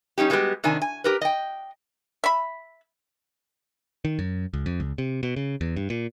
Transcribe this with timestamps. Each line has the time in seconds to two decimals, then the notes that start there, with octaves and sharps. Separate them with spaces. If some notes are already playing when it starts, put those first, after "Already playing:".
0.18 G3 C#4 D#4 G4
0.30 G3 G#3 B3 F#4 G4
0.64 C3 D#3 D4 G#5
0.82 G#5
1.04 G4 A#4 B4
1.21 D#5 G5
2.24 E5 B5
4.05 D#3
4.19 F#2
4.53 C#2
4.66 F2
4.80 C#2
4.98 C3
5.23 B2
5.36 C#3
5.61 E2
5.76 G2
5.90 A#2